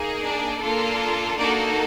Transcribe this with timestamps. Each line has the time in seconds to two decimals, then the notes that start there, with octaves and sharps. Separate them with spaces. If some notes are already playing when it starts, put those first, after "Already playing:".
Already playing: A#3 D#4 G#4
0.22 D4 D5
0.60 A#3 D4 F4 A4
1.37 A#3 D4 D#4 F#4 A4 D5